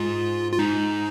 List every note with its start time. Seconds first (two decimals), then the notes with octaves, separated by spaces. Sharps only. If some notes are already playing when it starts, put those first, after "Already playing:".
Already playing: G#2 F4
0.52 F4
0.59 G#2 D#4